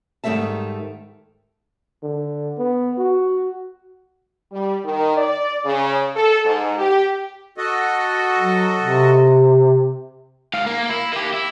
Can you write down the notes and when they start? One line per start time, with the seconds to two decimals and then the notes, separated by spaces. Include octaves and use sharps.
0.24 G#2 D#3 G3 A3 E5 A5
2.03 D3
2.58 B3
2.98 F#4
4.52 G3
4.84 D#3
5.17 D5
5.65 C#3
6.16 A4
6.45 G#2
6.77 G4
7.58 F#4 A4 D#5
8.39 F#3
8.80 C3
10.54 G#2 F5
10.66 A#3
10.89 E4
11.13 A#3 G4
11.34 E4